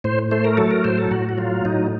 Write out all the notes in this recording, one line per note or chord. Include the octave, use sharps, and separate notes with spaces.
A2 C5
A3 C5
A#4
F#3 A4
A#4
A2 C5
A4
A2 F#4
F#4
F#3 F4
A2 D#4